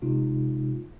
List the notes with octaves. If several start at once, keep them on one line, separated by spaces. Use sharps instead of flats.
C3 G#3 D#4 F4